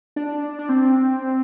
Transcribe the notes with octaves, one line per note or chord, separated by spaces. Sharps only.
D4
D4
C4